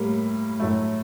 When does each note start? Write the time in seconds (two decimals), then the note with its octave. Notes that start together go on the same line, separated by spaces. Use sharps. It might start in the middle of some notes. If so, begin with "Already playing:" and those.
Already playing: A2 G3 A#3
0.60 A2 F#3 A3